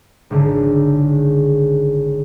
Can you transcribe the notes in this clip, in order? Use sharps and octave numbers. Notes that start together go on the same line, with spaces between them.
G#1 C#2 D3